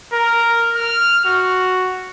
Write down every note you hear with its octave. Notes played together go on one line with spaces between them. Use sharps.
A#4
F6
F#4